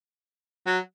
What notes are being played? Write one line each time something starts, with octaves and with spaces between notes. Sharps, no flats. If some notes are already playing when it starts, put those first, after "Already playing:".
F#3